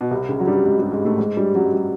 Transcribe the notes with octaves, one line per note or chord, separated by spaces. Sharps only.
B2
C2 C3
C#2 C#3
F#3
G2 G3
G#2 G#3
G2 G3
G#2 G#3
A2 A3
G#2 G#3
G2 G3
F#2 F#3
G#3
G3